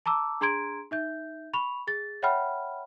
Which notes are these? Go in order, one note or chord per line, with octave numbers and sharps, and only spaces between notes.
A5 A#5 D6 E6
D4 G#4 A#5 C6 G#6 D7
D#4 E5 G6
B5 C#6 F7
G#4 A6
C#5 E5 F#5 G5 B5 F6